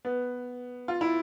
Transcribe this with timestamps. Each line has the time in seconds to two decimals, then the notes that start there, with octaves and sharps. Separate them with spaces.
0.05 B3
0.88 F4
1.01 E4